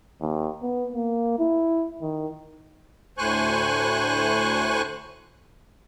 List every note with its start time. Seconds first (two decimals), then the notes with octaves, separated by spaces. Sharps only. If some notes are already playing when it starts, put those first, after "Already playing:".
0.21 D#2
0.62 B3
0.93 A#3
1.39 E4
2.02 D#3
3.18 D2 A2 C5 G#5 C#6 F#6